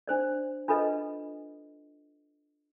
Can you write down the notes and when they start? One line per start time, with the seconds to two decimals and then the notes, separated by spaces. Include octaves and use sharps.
0.08 D4 C5 D5
0.68 D4 F4 A4 B4 D#5